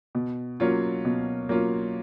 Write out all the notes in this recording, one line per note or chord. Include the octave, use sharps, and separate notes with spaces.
B2
F#3 A#3 C#4 F4
B2
F#3 A#3 C#4 F4